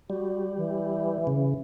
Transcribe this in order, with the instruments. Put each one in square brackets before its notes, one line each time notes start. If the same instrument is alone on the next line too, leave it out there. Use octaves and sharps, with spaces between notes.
[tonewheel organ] G3 [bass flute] F#4
[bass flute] E3
[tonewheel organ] C#3